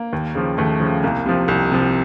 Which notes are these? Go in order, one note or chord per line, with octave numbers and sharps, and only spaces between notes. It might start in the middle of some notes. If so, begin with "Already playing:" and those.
Already playing: A#3
D#2
C#3 F3
D#2 A3
C#3 F3
C2 A#3
C3 F3
C2
C3 F3